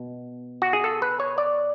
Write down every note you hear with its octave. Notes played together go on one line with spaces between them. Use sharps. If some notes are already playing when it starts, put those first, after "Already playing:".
Already playing: B2
F#4
G#4
A4
B4
C#5
D5